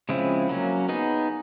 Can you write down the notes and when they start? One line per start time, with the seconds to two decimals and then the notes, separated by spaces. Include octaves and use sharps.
0.09 C#3 F3 G#3 C4 E4
0.49 F#3 A#3 C#4
0.89 B3 D#4 G#4